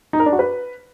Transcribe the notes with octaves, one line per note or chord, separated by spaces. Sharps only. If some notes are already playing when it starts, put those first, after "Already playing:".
D#4
A#4
D4
F#4
B4